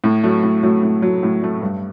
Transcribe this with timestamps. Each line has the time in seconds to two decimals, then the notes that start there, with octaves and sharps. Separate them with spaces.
0.04 A2
0.24 F#3 A3
0.43 A2
0.63 F#3 A3
0.83 A2
1.02 F#3 A3
1.23 A2
1.43 F#3 A3
1.62 G2